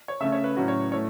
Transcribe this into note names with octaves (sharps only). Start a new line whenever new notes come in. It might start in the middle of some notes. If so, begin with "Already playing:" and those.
C#5
C#3 A3 C#4 E5
C#5
B4
A2 F#3 C#4 F#4
C#5
A2 A3 C#5